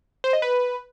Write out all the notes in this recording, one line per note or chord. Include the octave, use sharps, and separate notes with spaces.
C5
D#5
B4